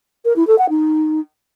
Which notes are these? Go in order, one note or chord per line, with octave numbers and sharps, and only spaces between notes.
A#4
E4
A4
F#5
D#4